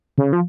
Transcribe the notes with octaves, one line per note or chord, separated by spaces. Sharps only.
C#3
F3